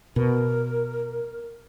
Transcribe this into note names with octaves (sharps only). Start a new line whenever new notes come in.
B2 A#4